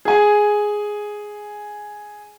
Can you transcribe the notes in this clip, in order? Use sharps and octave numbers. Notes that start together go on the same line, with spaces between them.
G#4 G#5